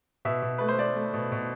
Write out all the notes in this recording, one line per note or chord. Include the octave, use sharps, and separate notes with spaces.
B2 E5
B2
A3 B4
C5
A3 D5
A3
B2
B2